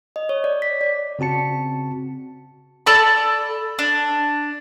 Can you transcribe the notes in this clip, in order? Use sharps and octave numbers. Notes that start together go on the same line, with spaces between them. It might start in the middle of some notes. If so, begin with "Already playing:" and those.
D#5
C#5
D5
B6
D5
C#3 C4 F#4 A5 C#7
A4 D5 A5 B5
D4